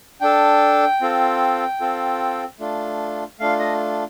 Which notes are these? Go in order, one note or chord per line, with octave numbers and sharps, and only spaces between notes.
D4 A4 G5
C4 F4 A4
C4 F4 A4
A3 D4 F4
A3 D4 F4 F5
D#5